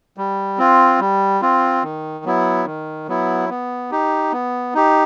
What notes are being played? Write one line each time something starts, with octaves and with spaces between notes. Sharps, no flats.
G3
C4 F4
G3
C4 F4
D#3
F#3 B3 E4
D#3
F#3 B3 E4
B3
D#4 G4
B3
D#4 G4